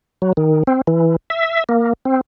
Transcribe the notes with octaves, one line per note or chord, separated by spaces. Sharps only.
F#3
D#3
C4
E3
E5
A#3
C4